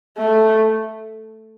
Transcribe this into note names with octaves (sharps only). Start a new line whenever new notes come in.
A3